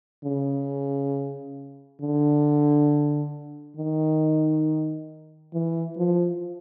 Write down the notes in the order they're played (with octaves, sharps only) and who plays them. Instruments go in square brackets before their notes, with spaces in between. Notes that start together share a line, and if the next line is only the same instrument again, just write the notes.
[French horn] C#3
D3
D#3
E3
F3